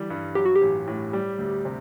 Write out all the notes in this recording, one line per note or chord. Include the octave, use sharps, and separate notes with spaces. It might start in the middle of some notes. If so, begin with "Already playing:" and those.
Already playing: D3 E3 G3
G2
F#3 G4
F#4
G4
A1
A2
G3
D2
C3